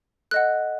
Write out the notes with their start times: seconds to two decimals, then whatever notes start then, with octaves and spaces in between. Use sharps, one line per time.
0.31 A4 D#5 F#5 F#6